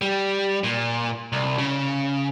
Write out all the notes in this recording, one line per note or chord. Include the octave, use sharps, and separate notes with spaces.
G3
A#2
C2
C#3